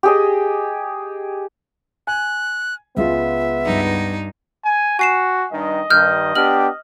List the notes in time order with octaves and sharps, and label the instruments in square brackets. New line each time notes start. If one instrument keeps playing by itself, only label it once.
[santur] G4 G#4 D#5
[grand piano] G#5 [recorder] F#6
[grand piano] C#2 G#3 F4 [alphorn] B3 [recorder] E5
[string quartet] G2 D#4
[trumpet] G#5
[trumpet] F#4 [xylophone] G#5 C7 E7
[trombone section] G2 D#3 [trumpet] D#5
[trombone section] G2 D#3 [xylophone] F6 G6
[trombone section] B3 D4 G4 [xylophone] F6 F#7